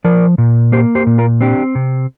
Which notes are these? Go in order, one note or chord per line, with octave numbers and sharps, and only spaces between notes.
F3 A#4 D5
A#2
A#3 G4 C5
G4 C5
A#2
F4 A#4
C4 D4 G4
C3